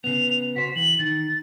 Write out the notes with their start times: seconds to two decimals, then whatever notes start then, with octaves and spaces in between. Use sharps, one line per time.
0.04 C#3 B3 F7
0.56 F#4 C5 B6
0.76 E3 F#7
0.99 D#3 A6